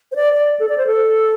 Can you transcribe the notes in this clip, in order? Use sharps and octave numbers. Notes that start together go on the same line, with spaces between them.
C5
D5
D5
A4
D5
C5
A4